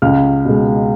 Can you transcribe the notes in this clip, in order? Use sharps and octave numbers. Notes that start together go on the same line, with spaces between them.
C#2 F6
B2 G#3